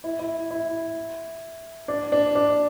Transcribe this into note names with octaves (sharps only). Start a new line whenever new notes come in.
E4
E4
E4
D4
D4
D4